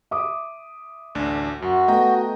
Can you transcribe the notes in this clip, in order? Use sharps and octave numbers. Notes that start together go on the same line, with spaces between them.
E5 D6 D#6
A1 D2 D4
F#2 F#4
A3 B3 D#5 G5 A#5